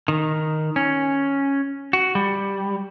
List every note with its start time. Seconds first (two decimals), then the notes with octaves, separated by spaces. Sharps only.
0.08 D#3
0.76 C#4
1.93 F#4
2.15 G3